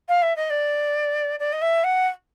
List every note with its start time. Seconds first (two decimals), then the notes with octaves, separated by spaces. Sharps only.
0.08 F5
0.22 E5
0.36 D#5
0.50 D5
1.39 D5
1.52 D#5
1.61 E5
1.84 F#5